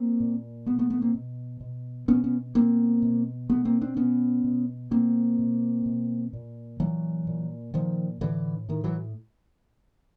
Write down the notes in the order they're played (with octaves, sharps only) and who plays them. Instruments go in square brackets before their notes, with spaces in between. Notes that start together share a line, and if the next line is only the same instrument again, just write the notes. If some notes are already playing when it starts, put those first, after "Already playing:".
Already playing: [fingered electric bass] A#3 C4
A#2
B2 A3 B3
A3 B3
A3 B3
A#3 C4
B2
B2
B2 B3 C#4
B3 C#4
B2 A#3 C4
B2
B2 A3 B3
A#3 C4
C4 D4
B2 B3 C#4
B2
B2 A#3 C4
B2
B2
A#2
A#2 E3 F#3
A#2
A#2 D#3 F3
A2 D3 E3
A2 D#3
E3 F#3